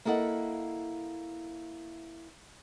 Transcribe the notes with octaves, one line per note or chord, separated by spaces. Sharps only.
A#3 E4 A4 D#5 F#5